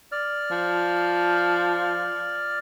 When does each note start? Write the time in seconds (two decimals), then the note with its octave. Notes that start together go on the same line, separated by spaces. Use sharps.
0.12 D5 F6
0.51 F3